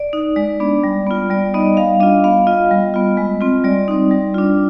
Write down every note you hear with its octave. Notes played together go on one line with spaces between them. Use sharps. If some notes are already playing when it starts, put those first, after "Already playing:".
Already playing: D5
D#4
G#3 D5
B3 D4
G3
B3 F4
G3 D5
B3 D#4 D#5
G3 F5
D4 F4 D#5
B3 F5
F4 D#5
G3
B3 F4
G#3
C4 F4
G3 D5
C4 D#4
G3
D4 F4